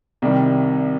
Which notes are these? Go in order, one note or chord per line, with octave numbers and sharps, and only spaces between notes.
C2 C3 D#3 G3